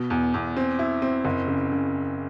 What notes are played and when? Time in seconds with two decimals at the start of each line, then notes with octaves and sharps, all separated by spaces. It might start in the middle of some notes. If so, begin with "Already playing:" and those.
Already playing: B2
0.10 E2
0.34 E2
0.57 C4
0.79 E4
1.02 C4
1.25 F#1
1.48 C#3
1.72 C#3